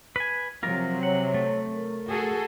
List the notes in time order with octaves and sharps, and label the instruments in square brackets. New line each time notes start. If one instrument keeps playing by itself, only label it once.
[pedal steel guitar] B4 G#5
[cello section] C3 F#3 [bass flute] F3 [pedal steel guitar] F4 A#4
[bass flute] C#5 [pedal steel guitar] F#5
[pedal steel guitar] A3
[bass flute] A#4
[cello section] F#4 G#4 A4